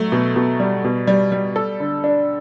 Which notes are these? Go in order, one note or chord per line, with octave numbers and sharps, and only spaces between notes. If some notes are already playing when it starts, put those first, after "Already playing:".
Already playing: F#3 A3
B2
B2
G3
B2
G3
G3
A4
D3
D4